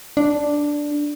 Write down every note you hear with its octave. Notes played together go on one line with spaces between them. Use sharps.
D4